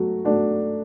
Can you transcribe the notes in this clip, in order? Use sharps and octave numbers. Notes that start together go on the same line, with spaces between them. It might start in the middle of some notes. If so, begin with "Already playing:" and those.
Already playing: F#3 A3 F#4
A3 D4 F#4